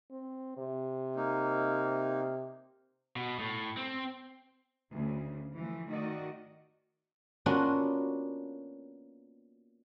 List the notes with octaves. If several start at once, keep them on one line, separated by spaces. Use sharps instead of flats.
C4
C3
A#3 D#4
B2
A2
C4
D2 C#3
E3 F3 A3
D#3 A3 F#4 D5 D#5
A#3 B3 C#4 D4 F4 F#4